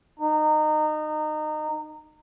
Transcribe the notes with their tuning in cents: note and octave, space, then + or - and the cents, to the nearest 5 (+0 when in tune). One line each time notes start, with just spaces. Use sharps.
D#4 -25